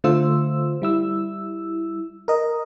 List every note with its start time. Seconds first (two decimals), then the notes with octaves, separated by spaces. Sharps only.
0.04 D3 A3 F4 C5 E6
0.82 G3 E4 E6
2.28 A#4 D#5